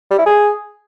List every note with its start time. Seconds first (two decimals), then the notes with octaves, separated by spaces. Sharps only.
0.11 G3
0.19 E4
0.26 G#4